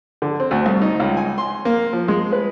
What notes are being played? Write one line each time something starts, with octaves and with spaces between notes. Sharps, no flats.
D3
C4
D2
C2
D#4
C#2
G#5
C6
A#3
F3
G#3
B4